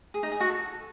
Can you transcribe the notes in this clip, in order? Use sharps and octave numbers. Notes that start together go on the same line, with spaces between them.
G#4
D#4
G#4
F#4
A4